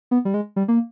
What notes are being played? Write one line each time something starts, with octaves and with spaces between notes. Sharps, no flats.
B3
G3
G#3
G3
A#3